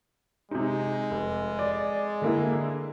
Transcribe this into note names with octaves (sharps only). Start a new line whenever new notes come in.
C3 G#3 D#4
F1
D5
D3 A#3 E4